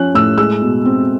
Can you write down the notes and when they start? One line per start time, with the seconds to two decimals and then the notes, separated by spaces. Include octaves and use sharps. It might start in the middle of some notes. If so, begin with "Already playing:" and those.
Already playing: F3 C#4 F#6
0.14 A2 E6
0.38 G#3 E6
0.62 B2
0.85 C4